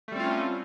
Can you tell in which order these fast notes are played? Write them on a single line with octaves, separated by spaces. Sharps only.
A3 G3 C4 F4 C#4